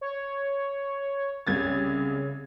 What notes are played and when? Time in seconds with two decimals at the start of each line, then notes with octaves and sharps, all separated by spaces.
0.01 C#5
1.47 C2 C#3 G#6 A6